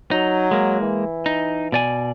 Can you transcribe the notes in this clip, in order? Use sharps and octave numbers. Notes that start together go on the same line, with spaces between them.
F#3 D#4
G#3 A#3
E3
D#4
B2 D5 G#5